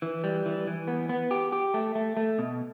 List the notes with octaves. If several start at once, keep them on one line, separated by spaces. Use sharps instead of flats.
E3
G3
E3
E3
B3
B3
G4
G4
A3
A3
A3
B2